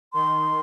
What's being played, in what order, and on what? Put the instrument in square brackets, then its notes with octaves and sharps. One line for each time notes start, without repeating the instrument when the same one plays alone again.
[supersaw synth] D#3 [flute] C6